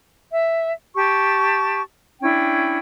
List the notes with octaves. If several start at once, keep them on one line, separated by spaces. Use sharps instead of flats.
E5
G4 A5 C#6
C#4 D4 E4 G5